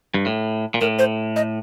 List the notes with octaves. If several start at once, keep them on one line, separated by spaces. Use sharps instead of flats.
G2
A2
A#2
A2 A#4
C5
D#5